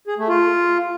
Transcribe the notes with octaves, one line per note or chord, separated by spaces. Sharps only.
G#4
A3
F4